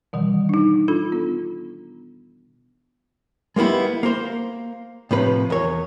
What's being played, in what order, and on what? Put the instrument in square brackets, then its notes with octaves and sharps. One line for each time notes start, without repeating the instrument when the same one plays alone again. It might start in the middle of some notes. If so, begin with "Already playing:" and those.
[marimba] B2 D#3 E3 G3
D4 D#4
D4 F4 A4 B5
B3
[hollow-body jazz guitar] G#3 A#3 B3 E4 G4
A#3 A#4 C5
A2 C3 F3 B4
E2 A#4 C#5